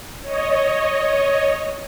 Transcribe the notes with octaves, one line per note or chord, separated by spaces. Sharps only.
C#5 D#5